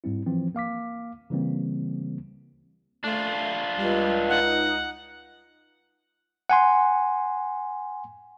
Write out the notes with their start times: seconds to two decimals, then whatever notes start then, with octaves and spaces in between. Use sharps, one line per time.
0.04 G#2 G3 C4 E4
0.26 E3 F3 C4
0.55 A#3 F5 D6 B6
1.30 C#3 E3 G3 A#3 C4
3.04 A3 D4 F4
3.78 C#2 G3
4.29 D#4 F#5
6.50 F#5 G#5 C6